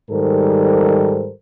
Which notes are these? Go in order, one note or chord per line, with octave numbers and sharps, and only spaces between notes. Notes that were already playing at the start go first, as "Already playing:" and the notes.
G#2 D#3 G3 A4 A#4 C5